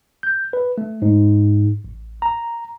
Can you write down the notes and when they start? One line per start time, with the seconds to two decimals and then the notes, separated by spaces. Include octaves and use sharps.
0.23 G6
0.53 B4
0.78 A3
1.02 G#2
1.84 A1
2.22 A#5